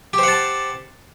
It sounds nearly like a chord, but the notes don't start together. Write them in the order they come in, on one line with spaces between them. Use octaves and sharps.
G4 C5 F#5 A5